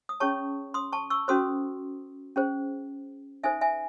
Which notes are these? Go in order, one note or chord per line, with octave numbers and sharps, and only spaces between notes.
D#6
C#4 G#4 C#5 A5 C#6
C6 D#6
A5 C#6
C#6 E6
C#4 F#4 A4 C5 C6 D#6
C#4 G#4 C5
D#4 A4 C5 E5 G#5
E5 G#5